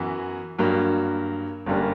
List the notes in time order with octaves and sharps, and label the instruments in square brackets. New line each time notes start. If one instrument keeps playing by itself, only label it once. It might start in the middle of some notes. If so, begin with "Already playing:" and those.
Already playing: [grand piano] F#2 E3 B3 F#4
G2 F#3 A#3
G1 F#2 D3 G3 A#3